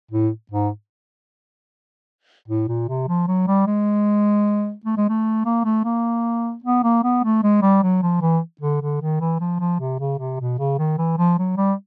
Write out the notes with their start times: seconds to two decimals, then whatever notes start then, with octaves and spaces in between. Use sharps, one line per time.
0.11 A2
0.51 G#2
2.48 A2
2.68 A#2
2.88 C3
3.08 F3
3.28 F#3
3.48 G3
3.67 G#3
4.85 A3
4.97 G#3
5.09 A3
5.45 A#3
5.65 A3
5.85 A#3
6.64 B3
6.84 A#3
7.03 B3
7.24 A3
7.43 G#3
7.62 G3
7.83 F#3
8.02 F3
8.21 E3
8.61 D3
8.82 D3
9.01 D#3
9.20 E3
9.40 F3
9.60 F3
9.80 C3
10.00 C#3
10.19 C3
10.40 B2
10.59 C#3
10.78 D#3
10.98 E3
11.18 F3
11.38 F#3
11.57 G3